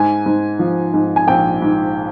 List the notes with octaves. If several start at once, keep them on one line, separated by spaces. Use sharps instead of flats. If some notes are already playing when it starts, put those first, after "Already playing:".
Already playing: G#2 G#5
G#2
F3
G#2
G#5
A#1 G5
G#2